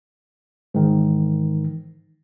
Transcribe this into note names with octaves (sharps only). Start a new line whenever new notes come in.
G#2 D#3 E3